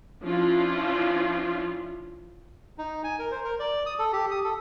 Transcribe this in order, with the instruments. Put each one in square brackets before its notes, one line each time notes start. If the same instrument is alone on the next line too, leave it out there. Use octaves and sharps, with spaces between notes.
[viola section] F3 C#4 D4 E4 F4
[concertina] D#4
G#5
A#4
C5
A#4
D5
D#6
A4
G4
D#6
A4